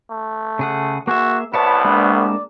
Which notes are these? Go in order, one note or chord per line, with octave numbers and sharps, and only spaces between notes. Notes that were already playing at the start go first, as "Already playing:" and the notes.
A3
C#3 G#4 F#5
A#3 F#4 G#4 E5
C2 B3 E4 B4 C#5 A5
G#3 A#3 D4
D5